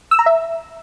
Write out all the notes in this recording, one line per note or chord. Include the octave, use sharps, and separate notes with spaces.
E6
A#5
E5